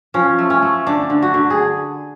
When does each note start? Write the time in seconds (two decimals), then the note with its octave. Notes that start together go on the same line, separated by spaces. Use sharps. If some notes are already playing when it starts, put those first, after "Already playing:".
0.14 F3 C#4
0.39 A3
0.50 C#4
0.62 A3
0.87 D3 D4
1.10 D3
1.22 F#4
1.34 D3
1.50 G#4